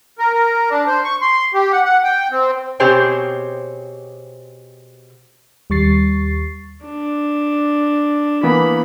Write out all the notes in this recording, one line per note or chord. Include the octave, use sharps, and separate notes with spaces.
A#4
A#4
D4
C5
C#6
C6
G4
F#5
F#5
G5
C4
B2 C4 G4 G#4 C5 C#5
D#2 G3 C#6 A6 C7
D4
E3 A#3 B3 B5